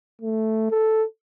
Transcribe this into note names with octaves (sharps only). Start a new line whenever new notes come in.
A3
A4